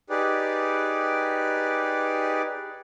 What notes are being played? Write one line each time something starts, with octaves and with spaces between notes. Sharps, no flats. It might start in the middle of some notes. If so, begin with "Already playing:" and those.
D#4 G4 G#4 B4 D5